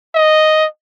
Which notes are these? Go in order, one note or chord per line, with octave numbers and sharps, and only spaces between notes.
D#5